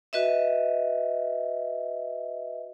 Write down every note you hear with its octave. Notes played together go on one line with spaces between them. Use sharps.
F#4 B4 D#5 E5